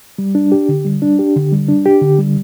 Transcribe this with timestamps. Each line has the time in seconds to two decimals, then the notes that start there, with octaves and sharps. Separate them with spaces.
0.18 G3
0.35 D4
0.52 G4
0.69 D3
0.85 G3
1.02 D4
1.19 G4
1.36 D3
1.52 G3
1.69 D4
1.86 G4
2.02 D3
2.19 G3